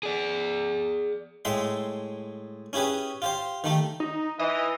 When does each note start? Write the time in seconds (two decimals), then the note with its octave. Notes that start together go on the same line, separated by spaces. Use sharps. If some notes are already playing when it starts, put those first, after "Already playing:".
0.03 G#4 D5
1.45 A2 G#3 E5 G5 C6
2.73 C#4 E4 G4 G#4 B4
3.22 F4 G4 C5
3.64 D#3 A3 G4
4.00 D#4
4.39 E3 D#5